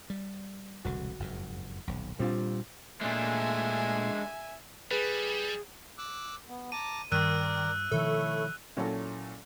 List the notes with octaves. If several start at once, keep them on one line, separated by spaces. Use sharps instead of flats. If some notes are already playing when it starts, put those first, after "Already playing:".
G3
E1 C2 D3 F#4
F#1 F2 G#2
D#1 B1
A#2 G3 C4 D4 F4
A#2 G#3 A3 D4 E5 G#5
G3 G#4 B4
D6 E6 F#6
B3
A5 A#5 D6 D#7
G2 D#3 A#4 D5 A#5 E6 F#6 D#7
B2 D#3 F3 A3 E4 A4 C#5
A#2 F#3 C#4 E4 F#4 A4